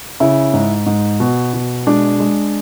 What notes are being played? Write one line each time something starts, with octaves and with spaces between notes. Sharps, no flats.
C#3 E4
G#2
G#2
B2
B2
G#3 D4
G#3